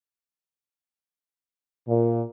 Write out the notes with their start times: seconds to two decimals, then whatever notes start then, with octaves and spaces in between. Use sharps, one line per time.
1.88 A#2